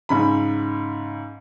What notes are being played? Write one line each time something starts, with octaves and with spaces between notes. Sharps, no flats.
G#2 C#3 B5